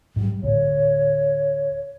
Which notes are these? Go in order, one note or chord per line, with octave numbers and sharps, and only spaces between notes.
G#2 F#3 G3
D2 A2 C#5